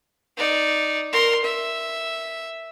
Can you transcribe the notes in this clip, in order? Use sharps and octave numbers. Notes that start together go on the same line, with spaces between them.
D#4 D5
A#4 C6
E5